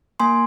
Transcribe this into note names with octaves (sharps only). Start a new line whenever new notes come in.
A#3 G#5 C6